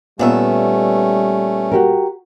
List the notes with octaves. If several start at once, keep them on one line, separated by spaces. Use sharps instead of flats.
A#2 G3 A3 B3 C#4 E5
F#4 G4 A#4